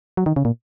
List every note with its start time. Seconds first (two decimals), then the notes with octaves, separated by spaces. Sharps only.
0.17 F#3
0.26 D#3
0.36 C#3
0.45 A#2